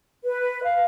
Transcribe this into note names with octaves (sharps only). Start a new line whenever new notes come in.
B4
F5